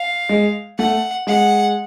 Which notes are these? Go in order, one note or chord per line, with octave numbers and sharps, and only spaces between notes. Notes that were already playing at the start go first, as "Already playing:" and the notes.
Already playing: F5
G#3
A3 F#5
G#3 F#5